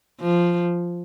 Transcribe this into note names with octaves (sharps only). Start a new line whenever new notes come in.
F3